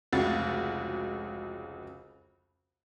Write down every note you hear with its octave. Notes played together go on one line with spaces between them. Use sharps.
F1 C#2 F#4 A6